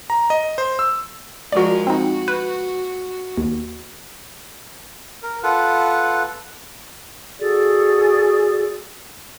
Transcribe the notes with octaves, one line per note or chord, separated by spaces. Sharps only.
A#5
D#5
C5
E6
F3 G#3 F#4 A#4 D5
C4 D#4 F#4
B4
D#2
A#4
F4 A4 B4 F#5
F#4 G#4 A4 D5